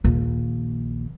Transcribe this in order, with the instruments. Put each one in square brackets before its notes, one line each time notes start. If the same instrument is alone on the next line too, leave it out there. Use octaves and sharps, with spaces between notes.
[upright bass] A#1 D#2